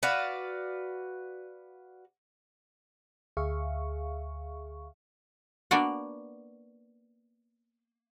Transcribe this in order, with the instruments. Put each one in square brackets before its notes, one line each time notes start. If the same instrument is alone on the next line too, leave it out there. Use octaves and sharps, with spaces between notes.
[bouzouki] F#4 B4 D5 F5
[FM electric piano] D2 G#4 E5 F5 C#6
[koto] A#3 B3 D4 F#4 D5 F#5